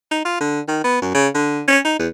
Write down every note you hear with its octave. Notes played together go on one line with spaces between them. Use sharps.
D#4
F4
D3
D#3
B3
F#2
C#3
D3
C#4
D#4
E2